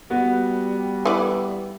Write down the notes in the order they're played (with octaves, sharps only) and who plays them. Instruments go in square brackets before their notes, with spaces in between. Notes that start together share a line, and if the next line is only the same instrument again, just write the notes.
[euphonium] G3 [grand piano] B3 F#4
[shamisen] E3 B4 D5